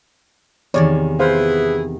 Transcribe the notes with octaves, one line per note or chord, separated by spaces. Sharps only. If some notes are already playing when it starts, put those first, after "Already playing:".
E2 C3 D#3 C#5 D5
B3 E4 G#4 C5 F5